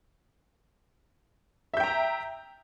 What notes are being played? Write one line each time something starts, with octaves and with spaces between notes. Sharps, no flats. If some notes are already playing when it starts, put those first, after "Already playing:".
E5 G5 A#5 G6